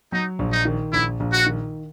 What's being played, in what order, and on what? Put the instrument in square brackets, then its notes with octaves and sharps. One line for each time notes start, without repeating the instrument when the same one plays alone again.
[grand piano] F#3 [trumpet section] D#4
[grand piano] A#1
[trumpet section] D#4
[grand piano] D#3
[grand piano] A#1 [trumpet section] E4
[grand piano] A#1
[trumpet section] F#4
[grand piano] D#3